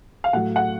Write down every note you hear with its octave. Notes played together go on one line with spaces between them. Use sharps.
F5
A2 F#3 A3 F#5
F#5